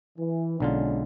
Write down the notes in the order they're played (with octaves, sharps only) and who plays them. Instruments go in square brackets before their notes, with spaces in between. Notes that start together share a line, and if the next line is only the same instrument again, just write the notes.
[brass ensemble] E3
[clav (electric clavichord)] B1 D3 F4 [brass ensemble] G#3 C#4 D4